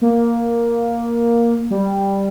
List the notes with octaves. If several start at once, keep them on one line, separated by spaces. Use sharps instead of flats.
A#3
G3